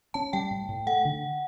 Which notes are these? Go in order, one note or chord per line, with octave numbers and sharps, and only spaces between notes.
C#4 A5
G3 G5
A2
A2
A3 F#5
D3